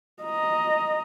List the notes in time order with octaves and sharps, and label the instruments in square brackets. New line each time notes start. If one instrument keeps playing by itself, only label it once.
[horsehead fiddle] D#5 A#5